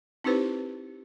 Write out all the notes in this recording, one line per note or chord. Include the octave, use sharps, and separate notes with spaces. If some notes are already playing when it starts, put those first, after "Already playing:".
C4 D#4 E4 G4 B4 C5